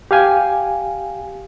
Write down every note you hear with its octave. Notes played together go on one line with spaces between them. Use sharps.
G4 F5 G#5